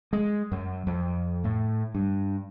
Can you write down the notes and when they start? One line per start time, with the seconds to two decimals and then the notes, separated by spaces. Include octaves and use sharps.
0.13 G#3
0.52 F#2
0.87 F2
1.44 A2
1.95 G2